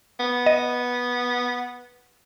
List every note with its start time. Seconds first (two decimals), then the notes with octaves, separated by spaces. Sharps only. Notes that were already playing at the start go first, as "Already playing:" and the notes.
0.19 B3
0.46 D#5